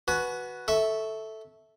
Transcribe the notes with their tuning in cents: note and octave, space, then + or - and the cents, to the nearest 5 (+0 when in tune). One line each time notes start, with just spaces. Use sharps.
F#4 +0 B4 -5 G#5 +40
A4 +0 E5 -15 C#6 +0